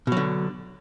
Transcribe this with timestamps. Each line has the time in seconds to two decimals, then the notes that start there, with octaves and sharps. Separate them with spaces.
0.07 B2
0.12 F#3
0.17 D3